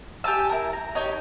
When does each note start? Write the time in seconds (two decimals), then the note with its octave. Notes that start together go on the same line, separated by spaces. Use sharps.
0.24 G4 G#5 A5 E6
0.49 E4 A#4
0.73 A#5
0.95 D#4 G4 C#5